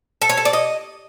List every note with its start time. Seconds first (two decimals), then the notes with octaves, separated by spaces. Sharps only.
0.22 A4
0.29 C#5
0.37 A4
0.45 D5
0.53 D#5